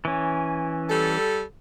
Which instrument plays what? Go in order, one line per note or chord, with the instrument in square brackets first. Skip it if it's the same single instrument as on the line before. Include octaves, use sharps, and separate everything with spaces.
[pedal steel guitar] E3 C#4
[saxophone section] G3 A4